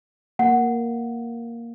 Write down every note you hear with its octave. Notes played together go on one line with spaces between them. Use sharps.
A#3 F#5